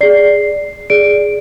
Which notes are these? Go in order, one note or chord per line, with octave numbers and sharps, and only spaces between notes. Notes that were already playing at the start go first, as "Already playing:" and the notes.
G#4 D5 C7
G#4 D5 D7